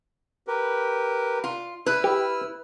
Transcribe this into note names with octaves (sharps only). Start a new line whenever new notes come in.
G4 A#4 B4
F4
E4 B4 E6 F6
G4